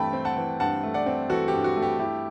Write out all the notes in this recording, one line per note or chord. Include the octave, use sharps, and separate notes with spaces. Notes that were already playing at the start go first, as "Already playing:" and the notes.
Already playing: G2 E3 A3 C4 G5 A5 B5
C4
F#5 A5
E3
G2 F#5 A5
A3
D5 F#5
C4
E3 F#4 A4
G4
G2
F#4
A3
G4
E4 G4